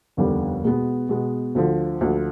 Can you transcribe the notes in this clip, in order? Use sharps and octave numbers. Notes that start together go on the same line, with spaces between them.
F1 D#2 D3 G3 B3
B2 G#3 B3
B2 G#3 B3
D2 D3 F3
D2 D3 F3